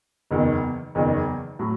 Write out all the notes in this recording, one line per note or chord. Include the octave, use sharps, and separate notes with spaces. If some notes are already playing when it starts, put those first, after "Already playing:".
F#1 E2 D#3
F#1 E2 D#3
A2 F#3